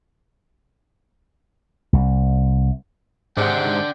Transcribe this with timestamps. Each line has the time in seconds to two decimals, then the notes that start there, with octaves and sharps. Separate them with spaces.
1.93 C2
3.37 G#2 C3 D4 F#5 G5